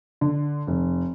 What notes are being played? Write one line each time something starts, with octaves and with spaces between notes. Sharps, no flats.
D3
F1